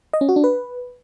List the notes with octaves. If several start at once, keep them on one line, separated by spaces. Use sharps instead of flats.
D#5
C#4
F#4
D4
B4